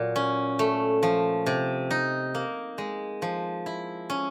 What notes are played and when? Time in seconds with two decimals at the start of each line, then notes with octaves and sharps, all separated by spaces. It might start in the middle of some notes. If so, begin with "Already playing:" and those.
Already playing: A#2 F#3
0.16 C#4
0.59 A3
1.03 F3
1.46 C3
1.91 D#4
2.35 A#3
2.78 G#3
3.22 F3
3.66 E4
4.10 C#4